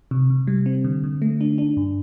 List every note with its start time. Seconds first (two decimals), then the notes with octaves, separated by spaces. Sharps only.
0.11 C3
0.30 C3
0.47 G3
0.66 C4
0.85 D3
1.04 D3
1.22 A3
1.41 D4
1.58 D4
1.77 G2